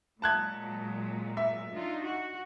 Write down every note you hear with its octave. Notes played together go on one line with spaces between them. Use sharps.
A#2 F#3 G#3 A5 F#6 G#6
E5
D4 D#4 F4
F#4